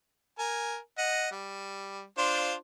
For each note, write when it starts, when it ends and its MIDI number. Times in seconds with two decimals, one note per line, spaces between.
0.39 0.78 70
0.39 0.78 80
0.98 1.28 75
0.98 1.28 78
1.31 2.04 55
2.18 2.54 62
2.18 2.54 65
2.18 2.54 72